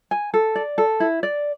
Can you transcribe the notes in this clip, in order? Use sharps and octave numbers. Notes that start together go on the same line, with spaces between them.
G#5
A4
D5
A4
E4
D5